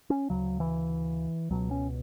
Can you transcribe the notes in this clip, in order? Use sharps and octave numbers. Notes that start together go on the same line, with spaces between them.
C#4
D2 C#3 F#3
E3
C#2 B2 F#3
C#4